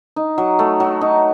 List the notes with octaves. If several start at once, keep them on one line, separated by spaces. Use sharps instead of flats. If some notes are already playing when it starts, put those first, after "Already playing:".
D#4
F#3
A3
F#3
D#4